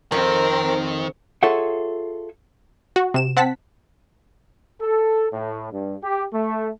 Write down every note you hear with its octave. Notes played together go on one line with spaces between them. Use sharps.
F2 D#3 C4 A#4
F4 G#4 A4 C#5 E5 F#5
F#4
C3 E7
C4 F#5 A5 B6
A4
A2
G2
G4
A3